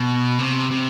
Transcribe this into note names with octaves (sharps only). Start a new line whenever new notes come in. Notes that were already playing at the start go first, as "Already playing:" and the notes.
Already playing: B2
C3
C3